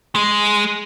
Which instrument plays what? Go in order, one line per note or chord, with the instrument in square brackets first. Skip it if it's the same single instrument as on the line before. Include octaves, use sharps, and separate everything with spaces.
[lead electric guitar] G#3